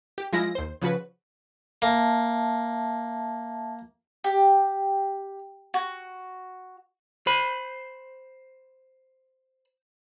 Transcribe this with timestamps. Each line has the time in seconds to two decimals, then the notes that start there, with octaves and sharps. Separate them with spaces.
0.18 G4
0.33 F3 G#3 E4 F4 A#6
0.55 D#2 C5
0.82 C#3 F3 F#4 B4
1.82 A#3 E5 A5
4.24 G4
5.74 F#4
7.27 C5 B5